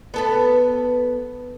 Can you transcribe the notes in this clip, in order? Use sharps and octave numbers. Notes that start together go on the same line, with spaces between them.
B3 A4 B4